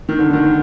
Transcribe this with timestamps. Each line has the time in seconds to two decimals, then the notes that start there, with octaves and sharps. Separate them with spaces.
0.09 D#3
0.19 D3
0.33 D#3